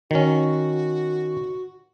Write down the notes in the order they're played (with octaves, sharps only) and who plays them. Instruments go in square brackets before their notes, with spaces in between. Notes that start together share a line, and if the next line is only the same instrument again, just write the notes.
[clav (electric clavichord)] D#3 C#4 [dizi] F#4